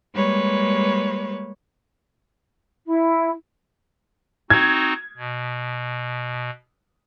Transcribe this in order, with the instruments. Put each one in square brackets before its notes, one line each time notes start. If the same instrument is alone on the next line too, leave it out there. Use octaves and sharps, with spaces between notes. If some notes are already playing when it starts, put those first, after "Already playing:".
[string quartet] G3 G#3 A#3 B4 C#5
[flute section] E4
[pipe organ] C4 D#4 F#4 [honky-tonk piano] G#6
[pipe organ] B2